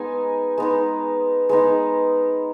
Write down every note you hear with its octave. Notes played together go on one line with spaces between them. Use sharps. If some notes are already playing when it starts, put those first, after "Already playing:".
Already playing: G#3 B3 D#4 G#5
G#3 B3 D#4
G#3 B3 D#4